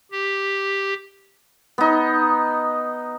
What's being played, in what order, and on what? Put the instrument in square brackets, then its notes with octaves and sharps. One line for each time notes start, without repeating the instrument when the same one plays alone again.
[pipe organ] G4
[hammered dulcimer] B3 D#4